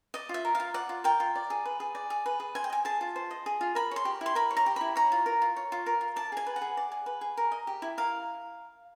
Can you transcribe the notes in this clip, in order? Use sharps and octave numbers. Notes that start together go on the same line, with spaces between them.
D5 D#5
F4 E5
A#4
F4 F5
D5 F#5
F4
A#4 G5
F4
D5
G#4
B4
G#4
D5
G#4
B4
G#4
C5 G#5
G5
D#5 G#5
G#4 A5
F4
C5
D#5
G#4
F4
A#4 B5
C#5 C6
G4
E4 C6
A#4 B5
C#5
A#5
G4
E4 B5
C#5 A#5
F4
A#4
F4
C#5
F4
A#4
F4
D5 A5
G#4 G#5
B4
F#5
G#4
D5
G#4
B4
G#4
A#4
D#5
G4
E4
A#4 F5